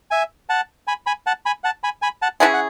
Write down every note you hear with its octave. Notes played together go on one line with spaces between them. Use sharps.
E5 G#5
F#5 A5
G#5 B5
G#5 B5
F#5 A5
G#5 B5
F#5 A5
G#5 B5
G#5 B5
F#5 A5
C#4 E4 G#4 F#5 A5
F#5